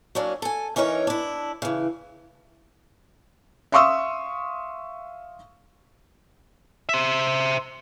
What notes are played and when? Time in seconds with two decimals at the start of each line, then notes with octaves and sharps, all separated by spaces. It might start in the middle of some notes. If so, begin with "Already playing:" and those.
0.15 F#3 A#3 C#4 D4
0.42 A4 G#5
0.76 E3 C#4 D#4 A#4 C#5
1.07 D4 E4
1.62 C#3 E3
3.72 E5 F5 C6 C#6 D#6 E6
6.89 C5 E5